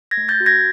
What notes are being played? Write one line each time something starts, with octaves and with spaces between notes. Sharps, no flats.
G#6 A#6
A3
G6 A6
F#4
G#6 A#6